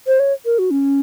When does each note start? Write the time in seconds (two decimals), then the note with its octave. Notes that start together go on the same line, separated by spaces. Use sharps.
0.07 C5
0.20 C#5
0.45 A#4
0.59 F#4
0.71 C#4